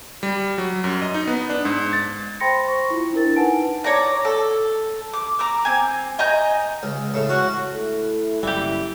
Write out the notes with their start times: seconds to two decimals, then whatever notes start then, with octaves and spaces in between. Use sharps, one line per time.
0.23 G3
0.58 F#3
0.84 F#2
1.02 D#5
1.14 D#4
1.27 B3
1.50 D4
1.65 G#2
1.93 A6
2.40 C5 G5 B5 C6 A#6 C#7
2.68 C5 C#6
2.90 E4 F4
3.13 D4 E4 A#4 A6
3.36 D#4 B4 F#5 G#5 A5 D7
3.84 C#5 D5 A#5
4.25 A4
5.13 D6
5.39 A#5 D6 E6
5.65 C4 G#5
6.19 D#5 G#5 A#5 G6
6.83 C#2
7.14 A2 C#3
7.29 C#4 F#4
7.73 A3 E4
8.43 F#1 D#2 E3 G3 E4 G4